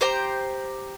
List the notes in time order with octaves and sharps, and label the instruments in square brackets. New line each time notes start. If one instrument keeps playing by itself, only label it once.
[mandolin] G4 C5 G5 A#5